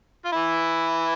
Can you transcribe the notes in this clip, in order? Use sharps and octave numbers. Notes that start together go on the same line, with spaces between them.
F4
E3 E4